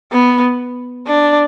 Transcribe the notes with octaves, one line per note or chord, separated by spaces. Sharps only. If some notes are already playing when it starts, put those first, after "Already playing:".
B3
D4